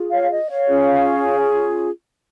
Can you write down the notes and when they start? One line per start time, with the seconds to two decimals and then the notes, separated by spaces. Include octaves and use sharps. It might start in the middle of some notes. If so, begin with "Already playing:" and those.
Already playing: F4 G#4
0.11 C#5 F5
0.30 D#5
0.50 C#5 F5
0.68 C#4 F4 G#4